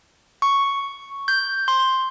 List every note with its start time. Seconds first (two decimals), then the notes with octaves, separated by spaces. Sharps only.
0.42 C#6
1.28 G6
1.68 C6